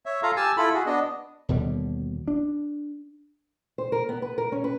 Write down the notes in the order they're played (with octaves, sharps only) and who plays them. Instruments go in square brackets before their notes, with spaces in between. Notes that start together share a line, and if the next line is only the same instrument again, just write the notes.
[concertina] C#5 E5
F4 A4 F5 A#5
G4 G#5 A5 E6
E4 F4 A4 B5
F#4 G#4
B3 D4 D#5
[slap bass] D#2 B2 D3 G3
D4
[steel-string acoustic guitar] C5
A#4
B3
B4
A#4
C#4
B4